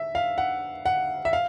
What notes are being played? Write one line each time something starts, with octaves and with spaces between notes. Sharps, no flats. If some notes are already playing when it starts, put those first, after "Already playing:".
Already playing: E5
F5
F#5
F#5
E5
F5